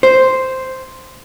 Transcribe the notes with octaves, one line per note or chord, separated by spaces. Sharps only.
C5